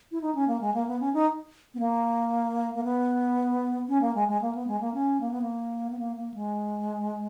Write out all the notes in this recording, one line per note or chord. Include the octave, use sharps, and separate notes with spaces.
E4
D#4
C#4
A#3
G#3
A#3
B3
C#4
D#4
B3
A#3
A#3
B3
C#4
A#3
G#3
G#3
A#3
B3
G#3
A#3
C#4
A#3
B3
A#3
B3
A#3
A#3
G#3